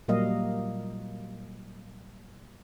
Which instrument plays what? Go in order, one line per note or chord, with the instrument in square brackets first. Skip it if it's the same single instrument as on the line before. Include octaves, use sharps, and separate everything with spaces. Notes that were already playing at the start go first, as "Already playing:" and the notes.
[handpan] A#2 F#3 G3 A#3 D#5 F5